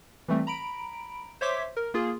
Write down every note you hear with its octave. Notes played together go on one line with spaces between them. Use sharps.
E3 G3 A3 C4
A#5 B5 D7
C5 C#5 E5 C6 D6 B6
A#4
A#3 F4 G#4